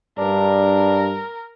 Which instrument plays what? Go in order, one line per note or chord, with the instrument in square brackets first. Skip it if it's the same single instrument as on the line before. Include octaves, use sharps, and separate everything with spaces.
[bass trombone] G2 [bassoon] D4 [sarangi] A#4